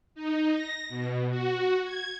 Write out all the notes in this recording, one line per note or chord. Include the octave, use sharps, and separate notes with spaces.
D#4
A#6
B2
F#4
G#6